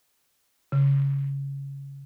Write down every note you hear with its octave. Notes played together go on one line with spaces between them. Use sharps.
C#3